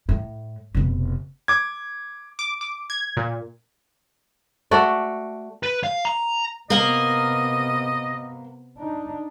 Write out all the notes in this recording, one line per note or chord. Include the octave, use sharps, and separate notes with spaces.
A2
F1 B2
D6 G#6
D6
D6
G#6
A#2
A3 F#4 D5
B4
F5
A#5
C3 A#3 B3 A#4 D#5
D4 D#4